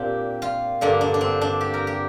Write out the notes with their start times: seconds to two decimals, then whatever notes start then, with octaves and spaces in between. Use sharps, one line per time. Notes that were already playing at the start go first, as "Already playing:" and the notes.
Already playing: A#2 A#3 C4 D4 G4
0.42 F4
0.81 G2 D3 A#3 D4
1.01 D4
1.14 D4
1.21 C4
1.41 D4
1.61 G4
1.74 A#4
1.87 G4